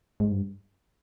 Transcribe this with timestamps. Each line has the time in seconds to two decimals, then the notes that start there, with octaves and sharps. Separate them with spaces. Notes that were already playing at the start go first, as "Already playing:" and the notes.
0.20 G#2
0.31 G2